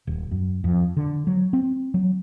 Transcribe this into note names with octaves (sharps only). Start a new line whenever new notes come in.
D#1
F#2
F2
D3
F#3
C4
F#3